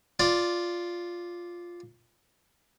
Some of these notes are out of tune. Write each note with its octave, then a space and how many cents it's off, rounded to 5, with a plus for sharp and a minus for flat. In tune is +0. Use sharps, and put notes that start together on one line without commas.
F4 +0 D5 +0